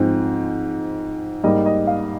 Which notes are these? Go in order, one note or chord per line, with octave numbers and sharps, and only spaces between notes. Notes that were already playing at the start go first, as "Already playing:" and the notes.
Already playing: G#2 F3 G#3 C4
G#2 G3 A#3 D#5
D#5
F5